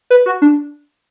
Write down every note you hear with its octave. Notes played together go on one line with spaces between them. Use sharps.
B4
F#4
D4